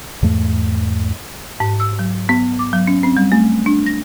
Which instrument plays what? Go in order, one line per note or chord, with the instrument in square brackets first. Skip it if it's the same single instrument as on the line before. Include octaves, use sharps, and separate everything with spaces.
[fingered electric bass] E2 G#2 A3
[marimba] G#2
E6
F#3
B3
D6
F#3
C#4
C4
G3
A3
D4
A#6